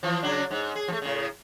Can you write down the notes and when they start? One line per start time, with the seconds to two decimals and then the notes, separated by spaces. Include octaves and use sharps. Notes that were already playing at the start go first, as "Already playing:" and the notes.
0.03 E3 F3
0.22 C#3 F#3 D4
0.51 G#2
0.75 G#4
0.88 F3 A3
1.02 A2 C#3